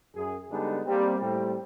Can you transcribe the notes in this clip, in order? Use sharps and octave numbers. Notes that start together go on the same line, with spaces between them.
F#2 G#4
D3 G3 G#3 B3 D4 D#4
G3 A#3 C4
A2 G3 C4